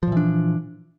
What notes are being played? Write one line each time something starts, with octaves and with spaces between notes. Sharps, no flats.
A#2 E3 F3 D4